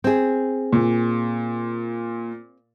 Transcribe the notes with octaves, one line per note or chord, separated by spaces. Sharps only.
C4 G#4
A#2